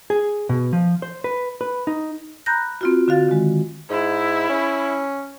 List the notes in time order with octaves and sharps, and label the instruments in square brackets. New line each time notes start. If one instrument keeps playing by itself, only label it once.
[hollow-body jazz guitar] G#4
B2
F3
C5
B4
B4
D#4
[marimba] A#5 B5 F#6 G6 A#6
C4 F4 F#4
D3 F#4 F5 A6
D#3 G#3
[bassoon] G#2 [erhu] E4
[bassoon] C#4